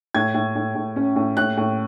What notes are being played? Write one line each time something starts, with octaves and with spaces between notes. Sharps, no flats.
A2 G#6
A2
A2
A2
C#4
A2
A2 F#6
A2